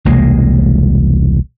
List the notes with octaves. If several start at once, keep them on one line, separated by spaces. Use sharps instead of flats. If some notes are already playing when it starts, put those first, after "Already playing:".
E1 C2 G#3 A#3